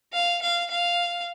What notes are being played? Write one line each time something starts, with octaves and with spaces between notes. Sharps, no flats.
F5
F5
F5